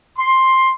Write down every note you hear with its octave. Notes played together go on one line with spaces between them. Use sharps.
C6